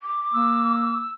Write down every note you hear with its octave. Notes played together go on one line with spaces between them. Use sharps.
D6
A#3 E6